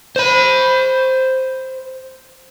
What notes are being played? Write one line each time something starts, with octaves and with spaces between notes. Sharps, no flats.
C5 B5